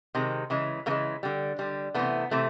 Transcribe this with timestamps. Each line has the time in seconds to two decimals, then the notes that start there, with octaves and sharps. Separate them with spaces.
0.15 C3 D#3 G#3
0.50 C#3 E3 G#3
0.86 C#3 E3 G#3 A#3
1.23 D3 G3
1.59 D3 G3
1.95 C3 E3 A3 B3
2.31 C3 E3 A3